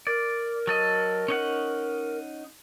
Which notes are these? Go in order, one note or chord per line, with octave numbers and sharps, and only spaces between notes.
A#4 D5
F#3 A4 D#5
C#4 D#4 F#5